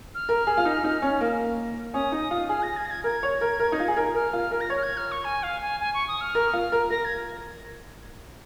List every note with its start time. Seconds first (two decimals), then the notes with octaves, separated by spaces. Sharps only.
0.15 F6
0.29 A#4
0.47 G#4
0.58 F4
0.65 D#4
0.84 D#4
1.02 C#4
1.21 A#3
1.94 C#4 D#6
2.12 D#4
2.31 F4
2.49 G#4 F6
2.63 A#6
2.77 G#6
2.86 A#6
2.91 G#6
3.04 A#4 G#6
3.23 C#5
3.41 A#4
3.59 A#4
3.72 D#4
3.80 F4
3.88 G#4
3.97 A#4
4.14 A#4 F6
4.33 F4
4.51 A#4
4.61 A#6
4.70 C#5 G#6
4.76 F6
4.83 G#6
4.97 F6
5.12 C#6
5.25 G#5
5.43 F5
5.62 G#5
5.80 G#5
5.94 C#6
6.08 D#6
6.21 F6
6.35 A#4
6.53 F4
6.72 A#4
6.90 A#4 A#6
7.05 G#6